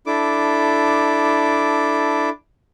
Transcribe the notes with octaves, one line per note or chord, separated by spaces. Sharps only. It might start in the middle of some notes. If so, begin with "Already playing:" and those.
D4 E4 A4 D6